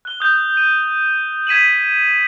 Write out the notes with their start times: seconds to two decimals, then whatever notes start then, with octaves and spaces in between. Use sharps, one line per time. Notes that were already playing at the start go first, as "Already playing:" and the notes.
0.05 F#6 G7
0.20 D#6 G6
0.57 D#7
1.47 G#6 B6 D#7 E7 F#7